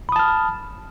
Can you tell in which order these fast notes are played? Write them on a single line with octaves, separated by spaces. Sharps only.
B5 D#6 A5 F6